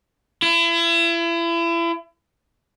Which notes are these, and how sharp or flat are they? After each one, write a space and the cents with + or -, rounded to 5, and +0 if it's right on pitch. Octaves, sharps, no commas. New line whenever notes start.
E4 +35